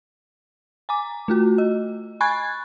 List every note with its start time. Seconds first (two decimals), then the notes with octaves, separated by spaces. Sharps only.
0.89 G#5 A#5 D6
1.28 A3 F4 F#4
1.58 D#5
2.21 G#5 B5 C#6 F#6 G#6 A6